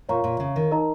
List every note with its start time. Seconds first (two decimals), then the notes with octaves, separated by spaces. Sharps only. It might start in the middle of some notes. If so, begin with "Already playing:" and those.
0.09 A#2 C#5 F5 A#5 C#6
0.24 A#2
0.40 C#3
0.56 D#3
0.71 D#4 A#4 D#5 A#5